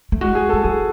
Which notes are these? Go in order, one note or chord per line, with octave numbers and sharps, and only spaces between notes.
A3
G#3 F#4
G#4
G#3 A4
F#3 G#4